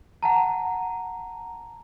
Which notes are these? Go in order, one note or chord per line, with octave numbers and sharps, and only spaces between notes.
F#5 A5 A#5